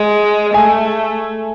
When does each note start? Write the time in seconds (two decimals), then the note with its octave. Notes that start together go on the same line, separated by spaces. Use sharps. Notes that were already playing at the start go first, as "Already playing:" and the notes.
Already playing: G#3
0.54 A3 G#5